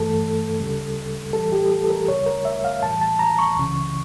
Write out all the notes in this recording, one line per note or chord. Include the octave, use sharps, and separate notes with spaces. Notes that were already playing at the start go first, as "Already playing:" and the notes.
Already playing: G2 E3 A3 A4
D2 C#3 G3
A2 E3 G3 A4
G4
A4
A4
A#4
D2 C#3 G3 C#5
A#4
E5
F5
A2 E3 G3 A5
A5
A#5
C#6
C#2 C#3 E3